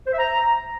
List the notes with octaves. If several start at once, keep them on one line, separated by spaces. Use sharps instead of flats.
C5
E5
A#5